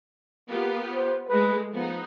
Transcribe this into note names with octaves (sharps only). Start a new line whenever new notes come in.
A#3 B3 F4 G4
C5
G#3 A3 B4
F3 B3 D#4